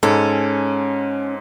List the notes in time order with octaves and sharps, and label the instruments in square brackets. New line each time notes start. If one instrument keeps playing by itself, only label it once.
[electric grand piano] G#2 G#3 A4 [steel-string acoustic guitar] C#4